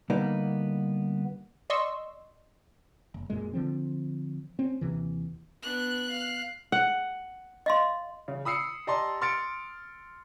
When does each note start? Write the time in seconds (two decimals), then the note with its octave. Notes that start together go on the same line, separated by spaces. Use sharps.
0.10 D3 G3 A#3 B3 D#4
1.70 D5 D#5 C6 C#6 E6
3.14 F#1
3.30 D1 F#2 A#2 G#3
3.53 D3 F3 C4
4.59 C4 C#4
4.81 D#2 C3 E3
5.62 B3 D4 F#6
6.09 F5
6.72 F#5
7.66 D#5 F5 C6
8.28 C#3
8.45 B5 D#6 E6 C7 C#7
8.87 G4 D5 D#5 A5 A#5 C6
9.21 C6 F6 A6 C#7 D7